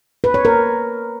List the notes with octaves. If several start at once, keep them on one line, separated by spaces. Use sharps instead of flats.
B4
C#5
A#4